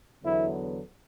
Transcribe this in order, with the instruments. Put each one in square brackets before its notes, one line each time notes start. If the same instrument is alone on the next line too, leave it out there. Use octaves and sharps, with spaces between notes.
[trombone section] E2 D3 F#3 B3 E4